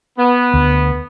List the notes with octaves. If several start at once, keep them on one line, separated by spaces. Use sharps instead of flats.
B3
D2